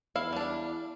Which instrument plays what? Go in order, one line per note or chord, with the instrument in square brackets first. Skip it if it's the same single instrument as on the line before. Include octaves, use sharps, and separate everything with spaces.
[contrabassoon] E2 [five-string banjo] E4 F5
[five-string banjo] G3 D4